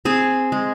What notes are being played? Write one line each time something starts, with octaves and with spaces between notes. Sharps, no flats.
C4 G#4
G#3